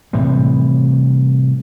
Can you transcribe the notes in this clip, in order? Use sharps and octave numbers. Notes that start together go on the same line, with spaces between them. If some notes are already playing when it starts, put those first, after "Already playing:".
A2 C3 E3 G3